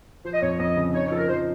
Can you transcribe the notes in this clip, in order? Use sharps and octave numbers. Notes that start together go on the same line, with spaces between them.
F3 C5
D#5
F2 C#5
F2 D#5
C#3
D#4 C#5
C#5
F3 A4
A#4
F3 C5